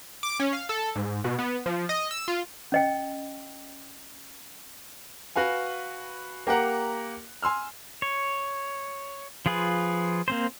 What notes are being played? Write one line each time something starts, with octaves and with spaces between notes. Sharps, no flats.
D6
C#4
F5
A4
G#2
B2
B3
F3
D#5
E6
F4
C#4 D#5 G5
F#4 B4 F5 G#5
A#3 G4 A#4 F#5 A#5
G#5 C6 E6 F6
C#5
F3 F4 G#4 B4
A#3 C4 C5